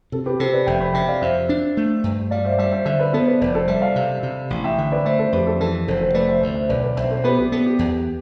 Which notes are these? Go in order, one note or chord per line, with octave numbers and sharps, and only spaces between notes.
C3 A4
G4 B4
C3 A4 C5
B4 D5
F1 E5 G5
G5 B5
C3 E5 G5
D5 F5
F2 C5 E5
D4
A3
G2
G3 D5 F5
C5 E5
D5
G3 C5 E5
C5 E5
D3 C5 E5
B4 D5
B3 A4 C5
B4 D5
F1 B4 D5
A4 C5
G3 C5 E5
D5 F5
C3
C3
A1
E5 G5
D3
B4 D5
A3 C5 E5
A4 C5
F2 G4 B4
A4
E3 A4
F1 A4 C5
A4 C5
A3 B4 D5
C5 E5
D2 C5 E5
C5 E5
B1 B4 D5
B4 D5
B1 C5 E5
A4 C5
B3 G4 B4
G4 B4
B3 A4
G4
E2